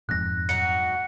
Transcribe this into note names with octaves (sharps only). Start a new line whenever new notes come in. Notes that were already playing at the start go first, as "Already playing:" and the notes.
D#1 F2 G#2 F#6 A#6
F#3 D#4 F#4 C#7